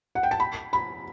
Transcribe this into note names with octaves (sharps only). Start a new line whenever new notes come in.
F#5
G5
A5
B5
B5